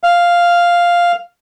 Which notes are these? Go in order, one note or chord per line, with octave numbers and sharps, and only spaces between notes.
F5